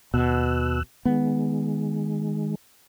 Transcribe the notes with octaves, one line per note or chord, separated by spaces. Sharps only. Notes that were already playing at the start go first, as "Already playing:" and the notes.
D#2 B2 E6 F#6
D#3 G#3 B3